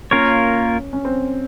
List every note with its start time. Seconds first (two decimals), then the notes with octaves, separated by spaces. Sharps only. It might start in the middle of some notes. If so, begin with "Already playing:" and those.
0.11 A#3 C#4 F4 A#4 C#5
0.93 C#4
1.05 C4